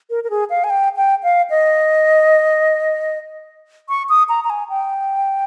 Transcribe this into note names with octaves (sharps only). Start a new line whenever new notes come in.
A#4
A#4
G#4
F5
G#5
G5
G5
F5
D#5
C#6
D#6
A#5
A#5
G#5
G5